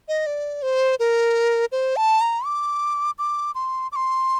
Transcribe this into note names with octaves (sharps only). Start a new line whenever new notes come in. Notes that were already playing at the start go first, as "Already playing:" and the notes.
D#5
D5
C5
A#4
C5
A5
A#5
D6
D6
C6
D6
C6